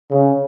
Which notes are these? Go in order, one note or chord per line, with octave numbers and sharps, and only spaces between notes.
C#3